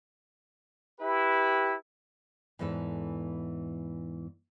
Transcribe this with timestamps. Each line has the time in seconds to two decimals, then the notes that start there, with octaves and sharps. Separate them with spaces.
1.01 E4 G4 B4
2.59 E2 G#2 E3 A4